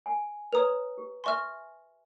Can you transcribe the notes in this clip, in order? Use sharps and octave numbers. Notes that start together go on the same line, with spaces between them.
G#5
B4 C#5 A#5 D#6 F7
G4
E5 G#5 C6 C#6 F6